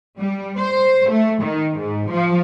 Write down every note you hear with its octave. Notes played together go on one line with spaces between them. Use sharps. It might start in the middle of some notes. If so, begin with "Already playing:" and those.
G3
C5
A3
D#3
G#2
F3